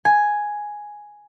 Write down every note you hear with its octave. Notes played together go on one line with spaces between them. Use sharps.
G#5